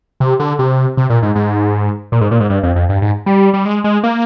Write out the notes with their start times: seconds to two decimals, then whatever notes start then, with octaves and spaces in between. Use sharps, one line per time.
0.20 C3
0.40 D3
0.59 C3
0.97 C3
1.10 A#2
1.23 G#2
1.35 G#2
2.12 A#2
2.21 G#2
2.31 A#2
2.40 G#2
2.50 G2
2.63 F2
2.76 F2
2.89 G2
3.02 G#2
3.26 G3
3.54 G3
3.65 G#3
3.84 G#3
4.03 A#3